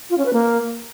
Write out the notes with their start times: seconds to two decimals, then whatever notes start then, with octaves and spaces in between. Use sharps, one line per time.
0.10 F4
0.18 C#4
0.25 B4
0.33 A#3